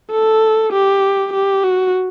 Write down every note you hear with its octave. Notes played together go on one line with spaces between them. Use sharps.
A4
G4
G4
F#4